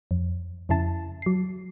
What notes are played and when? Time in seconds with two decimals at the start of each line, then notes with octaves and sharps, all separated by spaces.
0.11 F2
0.69 F2 C#3 E4 A5
1.22 F#3 C7